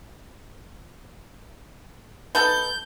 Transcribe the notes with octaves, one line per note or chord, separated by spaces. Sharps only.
B3 D#4 A4 G6